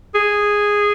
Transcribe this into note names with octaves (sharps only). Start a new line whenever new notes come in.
G#4